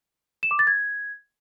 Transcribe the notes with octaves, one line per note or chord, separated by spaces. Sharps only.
E7
D6
A6
G#6